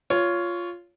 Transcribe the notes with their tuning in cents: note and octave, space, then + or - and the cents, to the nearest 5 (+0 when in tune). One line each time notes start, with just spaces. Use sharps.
F4 +0 C#5 +15